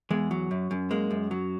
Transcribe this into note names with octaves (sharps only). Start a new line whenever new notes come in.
E2 G#3
F#3
F#2
F#2
G#3 A#3
F#2
F#3